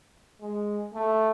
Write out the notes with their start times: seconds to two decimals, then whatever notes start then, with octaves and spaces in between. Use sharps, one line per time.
0.41 G#3
0.94 A3